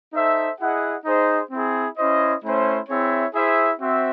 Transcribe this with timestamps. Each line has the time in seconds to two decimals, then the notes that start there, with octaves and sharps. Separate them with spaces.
0.13 D#4 A4 C5 E5
0.59 E4 G#4 D#5 F#5
1.05 D#4 G#4 C5 D#5
1.51 C4 E4 G#4
1.97 C#4 E4 C5 D#5
2.42 A3 C#4 E4 C5
2.89 C4 E4 G#4 C#5 E5
3.34 E4 G#4 C5 E5
3.80 C4 F#4 C5 E5